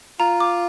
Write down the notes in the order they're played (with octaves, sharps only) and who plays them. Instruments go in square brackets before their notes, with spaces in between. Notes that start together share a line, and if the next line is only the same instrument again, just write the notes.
[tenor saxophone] F4 [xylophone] A#5
[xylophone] D6